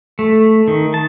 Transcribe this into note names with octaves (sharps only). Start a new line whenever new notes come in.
A3
D#3
A5